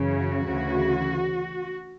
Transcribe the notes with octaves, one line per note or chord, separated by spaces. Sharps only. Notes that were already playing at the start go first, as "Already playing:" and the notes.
Already playing: F#2 C#3 E3
F#4
D2 C#3 E3